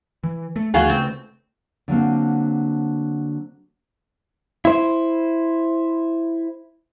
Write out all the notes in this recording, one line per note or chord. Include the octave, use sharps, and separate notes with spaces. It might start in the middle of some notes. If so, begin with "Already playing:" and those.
E3
A3
D2 E3 A3 F4 F#4 G#4
C#3 A3 C4
D3 F#3 A#3 C4
E4 C5